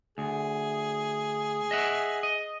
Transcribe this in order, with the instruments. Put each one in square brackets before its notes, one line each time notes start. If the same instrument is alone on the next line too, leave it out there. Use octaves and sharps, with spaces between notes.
[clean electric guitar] D2 [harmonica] G#4
[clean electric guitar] D#5 E5 F#5
D#5